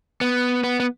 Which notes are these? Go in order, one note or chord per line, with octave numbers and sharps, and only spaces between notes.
B3
B3
B3